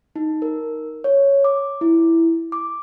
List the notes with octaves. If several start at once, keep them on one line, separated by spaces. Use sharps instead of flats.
D#4
A#4
C#5
D6
E4
D6